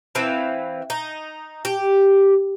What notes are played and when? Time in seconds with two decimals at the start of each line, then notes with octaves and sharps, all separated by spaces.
0.15 E3 C4 B4 F5
0.90 D#4
1.65 G4